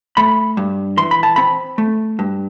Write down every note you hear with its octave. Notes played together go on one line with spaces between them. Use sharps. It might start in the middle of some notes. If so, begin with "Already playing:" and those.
A3 B5
G2
E3 C6
B5
A5
C4 B5
A3
G2